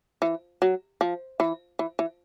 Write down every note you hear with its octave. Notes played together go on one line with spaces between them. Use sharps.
E3
F#3
F3
E3
E3
E3